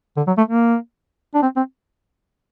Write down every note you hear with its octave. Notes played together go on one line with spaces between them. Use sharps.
D3
F#3
A3
A#3
D4
C4
C4